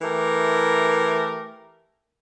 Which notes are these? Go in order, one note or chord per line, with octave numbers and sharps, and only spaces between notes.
E3 A3 G4 A#4